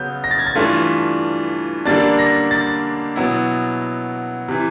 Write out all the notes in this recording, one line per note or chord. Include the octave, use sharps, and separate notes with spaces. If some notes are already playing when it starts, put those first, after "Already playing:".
Already playing: C#3 F#3 B3 G6
A#6
A6
G#6
A6
G2 E3 A3 D4 F4
D3 G3 A#3 D4 A6
A#6
A6
B2 F#3 B3 E4
C3 E3